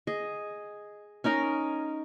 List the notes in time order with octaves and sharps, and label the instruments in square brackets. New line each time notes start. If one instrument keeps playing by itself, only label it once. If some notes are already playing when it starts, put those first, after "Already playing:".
[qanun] G#4 D#5
C#4 D#4 A#4 D#5